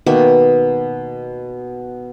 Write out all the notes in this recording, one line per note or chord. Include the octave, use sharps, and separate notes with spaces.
B2 D#3 A#3 E5